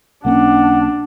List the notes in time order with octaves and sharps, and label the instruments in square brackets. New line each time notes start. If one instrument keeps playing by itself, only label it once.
[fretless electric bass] B1 A#3 C#4 [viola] D4 [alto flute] F#5